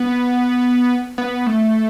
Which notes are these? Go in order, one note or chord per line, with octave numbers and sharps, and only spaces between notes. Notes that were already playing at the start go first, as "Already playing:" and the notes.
Already playing: B3
B3
A3